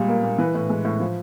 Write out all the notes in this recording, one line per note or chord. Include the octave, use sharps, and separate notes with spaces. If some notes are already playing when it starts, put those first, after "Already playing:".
Already playing: A#2 G3 G#3
A#3
A#2
E3 B4
A2
G#3
A2
F3